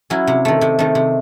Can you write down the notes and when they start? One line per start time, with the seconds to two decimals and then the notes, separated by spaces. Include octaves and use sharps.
0.10 F#3 C#4 E4
0.27 C3
0.45 D#3 A3
0.61 C3
0.79 D#3 A3
0.95 C3